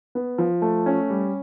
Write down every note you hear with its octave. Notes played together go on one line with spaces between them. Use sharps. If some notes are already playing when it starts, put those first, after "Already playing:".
B3
F3
A3
C#4
G3